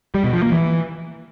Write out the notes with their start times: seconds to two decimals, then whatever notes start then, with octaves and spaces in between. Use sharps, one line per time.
0.15 G3
0.24 B2
0.33 F3
0.43 A#3
0.52 E3